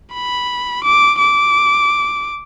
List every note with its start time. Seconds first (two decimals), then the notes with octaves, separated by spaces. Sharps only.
0.13 B5
0.84 D6
1.19 D6